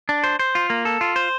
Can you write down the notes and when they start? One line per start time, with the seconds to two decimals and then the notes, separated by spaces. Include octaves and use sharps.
0.09 D4
0.24 C5
0.39 C5
0.55 F4
0.70 A#3
0.85 A4
1.01 F4
1.16 C5